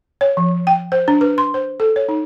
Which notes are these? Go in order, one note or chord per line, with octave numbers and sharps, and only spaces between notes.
C#5
F3
G5
C5
D4
B4
C6
C5
A4
C#5
D#4